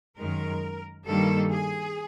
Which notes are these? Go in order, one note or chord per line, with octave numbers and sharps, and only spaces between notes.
F#2 D#3 G#3 A#4
G2 D#3 G3 A#3 A4
G#4